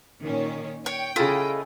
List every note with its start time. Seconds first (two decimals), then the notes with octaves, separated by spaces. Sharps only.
0.22 A#2 D#3 C#4
0.86 C#5 G5
1.16 C#3 E4 F4 A4 D#5